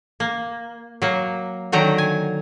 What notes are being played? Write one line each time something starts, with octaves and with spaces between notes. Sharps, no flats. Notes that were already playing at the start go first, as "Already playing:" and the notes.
A#3
F#3 A#3
D3 D#3 F#3 G5 A#5
G#5